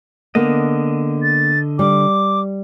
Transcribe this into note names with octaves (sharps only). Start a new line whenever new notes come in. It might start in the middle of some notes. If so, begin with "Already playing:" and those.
D3 A#3 B3 D#5
A6
G3 D6